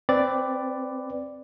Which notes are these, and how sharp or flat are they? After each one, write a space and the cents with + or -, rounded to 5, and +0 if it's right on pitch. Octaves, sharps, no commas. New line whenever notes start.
C4 +0 B4 +15 D5 +0